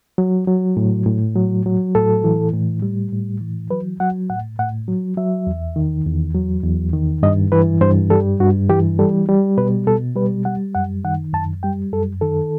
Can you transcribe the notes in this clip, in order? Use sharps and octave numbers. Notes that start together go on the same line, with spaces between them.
F#3
F#3
A2
A2
F#3
F#3
A2 A4
E3
A2
G3
A2
E3
F#3 B4
F#3 F#5
A2 F#5
A2 F#5
F#3
F#3 E5
E2
D#3
E2
F#3
E2
D#3
G2 D#5
E3 B4
G2 C5
G3 A4
G2 F#4
E3 G4
G3 A4
G3
B2 B4
B2 A4
G3 B4
G3 F#5
F#2 F#5
D#3 F#5
F#2 A5
G3 G5
F#2 A4
D#3 A4